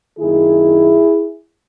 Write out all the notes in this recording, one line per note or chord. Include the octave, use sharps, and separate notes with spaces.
F#2 D#3 A#3 E4 G#4